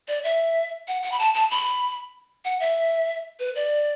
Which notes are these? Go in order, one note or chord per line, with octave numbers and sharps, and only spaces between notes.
D5
E5
F#5
F#5
B5
A5
A5
B5
F#5
E5
B4
D5